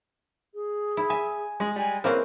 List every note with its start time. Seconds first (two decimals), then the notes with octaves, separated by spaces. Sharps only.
0.54 G#4
0.97 E4
1.10 E5 G#5
1.60 G#3 G#4
1.76 G3 G#5
2.04 A#3 C4 C#4 E4 G#4 B4 D#5